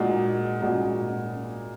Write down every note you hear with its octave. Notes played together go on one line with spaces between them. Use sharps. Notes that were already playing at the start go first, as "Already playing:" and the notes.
Already playing: A#2 G#3 D#4 F#4
A#2 G#3 D#4 F#4